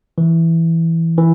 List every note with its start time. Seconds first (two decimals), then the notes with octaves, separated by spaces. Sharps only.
0.18 E3
1.18 E3